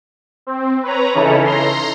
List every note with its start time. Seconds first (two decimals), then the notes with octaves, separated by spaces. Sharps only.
0.47 C4
0.83 B4 C#5 A#5
1.14 C#3 E3 C#4 D#4 E4 A4
1.45 A#5 C6